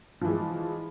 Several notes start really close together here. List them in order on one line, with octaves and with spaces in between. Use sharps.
F3 E3 G#3